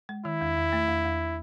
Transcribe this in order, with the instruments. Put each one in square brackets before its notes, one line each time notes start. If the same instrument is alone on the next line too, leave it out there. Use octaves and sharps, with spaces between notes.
[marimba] G#3
[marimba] D#3 [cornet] E4
[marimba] E2
E2
A3
E2
E2